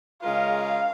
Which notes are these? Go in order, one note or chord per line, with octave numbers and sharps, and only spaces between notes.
C#3 G#3 F4 A#4 F5
F5